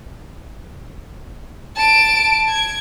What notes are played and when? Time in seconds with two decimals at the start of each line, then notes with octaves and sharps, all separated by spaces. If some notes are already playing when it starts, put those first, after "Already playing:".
1.77 A5 D7
2.49 G#6